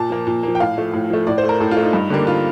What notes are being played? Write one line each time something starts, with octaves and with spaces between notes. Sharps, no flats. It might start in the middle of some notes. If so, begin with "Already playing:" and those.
Already playing: A#2 A5
F3 A#3
A#2
F3 A#3
G5
A2 F5
F3 A3
A2
F3 A3
A2 D5
C5
A3
A#4
A2 A4
F4
A3
D#4
G2
D3 G3 A#3
F4